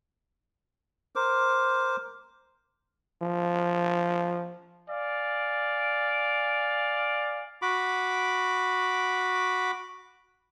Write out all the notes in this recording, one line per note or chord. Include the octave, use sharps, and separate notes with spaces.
A#4 C5 D6
F3
D5 F5 G#5
F#4 B5 D6